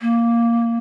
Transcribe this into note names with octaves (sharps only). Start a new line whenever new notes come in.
A#3